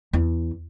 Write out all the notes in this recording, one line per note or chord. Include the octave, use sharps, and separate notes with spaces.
E2